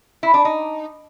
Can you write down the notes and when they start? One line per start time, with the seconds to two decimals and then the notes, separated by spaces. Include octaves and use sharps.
0.23 E4
0.34 D4
0.45 D#4